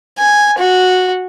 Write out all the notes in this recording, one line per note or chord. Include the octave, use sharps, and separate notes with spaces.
G#5
F#4